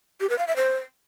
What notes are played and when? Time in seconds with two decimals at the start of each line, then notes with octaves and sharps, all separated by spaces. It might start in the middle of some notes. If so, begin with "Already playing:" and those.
0.21 G4
0.30 B4
0.38 F5
0.47 E5
0.56 C5